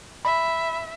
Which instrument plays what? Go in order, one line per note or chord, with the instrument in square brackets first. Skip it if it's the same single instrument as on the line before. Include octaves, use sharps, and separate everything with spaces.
[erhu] E5 [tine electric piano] B5